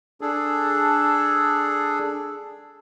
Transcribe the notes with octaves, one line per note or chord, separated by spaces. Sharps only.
D4 G#4 A4